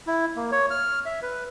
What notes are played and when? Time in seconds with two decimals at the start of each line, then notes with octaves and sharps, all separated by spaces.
0.07 E4
0.36 A#3
0.52 C#5
0.71 F6
1.06 E5
1.22 B4